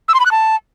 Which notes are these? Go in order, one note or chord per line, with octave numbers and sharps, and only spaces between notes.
E6
C6
B5
F#6
A5